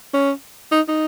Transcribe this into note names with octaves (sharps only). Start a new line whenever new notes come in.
C#4
D#4
D#4